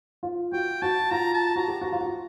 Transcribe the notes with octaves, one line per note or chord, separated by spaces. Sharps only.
F4
F#4 G5
F#4 A5
F4 A#5
A5
F#4 A#5
G4
F#4
F4
F#4